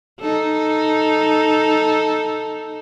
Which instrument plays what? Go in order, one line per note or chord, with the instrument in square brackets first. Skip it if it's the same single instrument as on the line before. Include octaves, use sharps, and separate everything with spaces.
[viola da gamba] D#4 A4